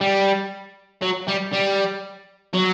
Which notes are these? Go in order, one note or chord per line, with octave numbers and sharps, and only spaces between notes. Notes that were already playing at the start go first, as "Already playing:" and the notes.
G3
F#3
G3
G3
F#3